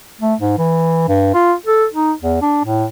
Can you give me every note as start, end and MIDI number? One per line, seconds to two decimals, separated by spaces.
0.21 0.35 57
0.40 0.54 44
0.58 1.05 52
1.08 1.30 43
1.34 1.53 65
1.66 1.86 69
1.94 2.12 63
2.21 2.37 40
2.41 2.64 62
2.64 2.86 45